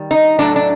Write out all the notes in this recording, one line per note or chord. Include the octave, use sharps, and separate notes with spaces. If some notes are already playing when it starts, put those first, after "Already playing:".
Already playing: D#3 G3
D#4
A2 F#3 A3 D4
D4